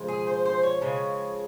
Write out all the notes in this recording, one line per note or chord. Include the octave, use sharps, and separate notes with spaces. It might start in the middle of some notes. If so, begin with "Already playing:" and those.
Already playing: C#3 F3 G#3
G#4
C5
C5
C#5
C#3 F3 G#3